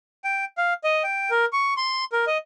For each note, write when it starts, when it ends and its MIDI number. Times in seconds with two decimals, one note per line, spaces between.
0.24 0.45 79
0.57 0.73 77
0.84 1.03 75
1.04 1.30 79
1.31 1.45 70
1.53 1.74 85
1.77 2.04 84
2.12 2.25 70
2.27 2.38 75